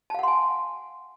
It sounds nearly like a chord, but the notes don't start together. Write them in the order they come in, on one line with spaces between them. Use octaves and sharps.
A5 F5 F#5 C6 G#5